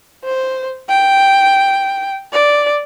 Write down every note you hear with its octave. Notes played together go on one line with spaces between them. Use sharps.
C5
G5
D5